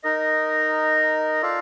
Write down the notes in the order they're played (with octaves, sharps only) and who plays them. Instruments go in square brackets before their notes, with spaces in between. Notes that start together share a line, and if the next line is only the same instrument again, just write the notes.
[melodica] D#4 A#4 D#5
F4 A4 D5 F5